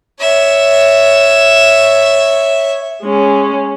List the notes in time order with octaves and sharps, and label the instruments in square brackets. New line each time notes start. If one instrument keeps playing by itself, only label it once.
[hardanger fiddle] C#5 E5
[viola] G#3 C#4